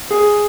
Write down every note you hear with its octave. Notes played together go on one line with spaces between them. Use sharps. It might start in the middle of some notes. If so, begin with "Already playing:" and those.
G#4